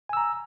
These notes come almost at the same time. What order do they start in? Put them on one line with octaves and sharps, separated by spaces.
G#5 E6 A#5